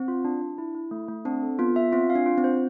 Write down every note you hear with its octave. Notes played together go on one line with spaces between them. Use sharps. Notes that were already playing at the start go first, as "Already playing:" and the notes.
Already playing: C4
F4
D4
D4
E4
E4
A3
A3
C4 D4
A4
B3 F4
E5
C4 F4
F5
D4
F4
C4
C5